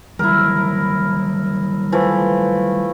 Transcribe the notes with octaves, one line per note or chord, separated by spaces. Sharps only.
D#3 F#3 G3 E4 A#4
E3 F3 A3